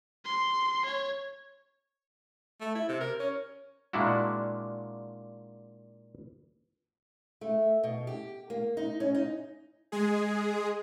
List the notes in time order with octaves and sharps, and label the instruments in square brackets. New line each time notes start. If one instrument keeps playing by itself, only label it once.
[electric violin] C6
C#5
[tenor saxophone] A3
E4
C3
A#4
C#4
[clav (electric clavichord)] A#2 G#3 A#3 D4 E4 F#4
[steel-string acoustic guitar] A3
B2
G4
A#3
D#4
C#4
D#4
[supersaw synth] G#3 G#4